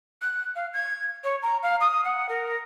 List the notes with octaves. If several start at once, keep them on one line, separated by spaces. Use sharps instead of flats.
F#6
F5
G#6
C#5
A#5
F5
D#6
F#5
A#4